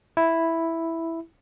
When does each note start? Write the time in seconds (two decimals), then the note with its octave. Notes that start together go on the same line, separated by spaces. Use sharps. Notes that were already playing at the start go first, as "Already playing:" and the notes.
0.17 E4